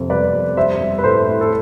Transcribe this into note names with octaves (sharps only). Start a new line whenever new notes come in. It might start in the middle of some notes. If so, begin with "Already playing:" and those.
Already playing: F2 C3
G3 B4 D5
F2
G3 C5 E5
G3
B4
A2 A4 C5
A2
A4